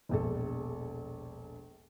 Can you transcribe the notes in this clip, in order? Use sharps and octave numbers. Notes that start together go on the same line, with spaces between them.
E1 A#1 A4